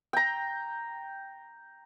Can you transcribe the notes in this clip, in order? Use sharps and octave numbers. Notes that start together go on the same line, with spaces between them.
G5 A#5